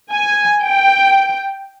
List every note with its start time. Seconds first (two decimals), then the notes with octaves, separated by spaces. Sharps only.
0.13 G#5
0.64 G5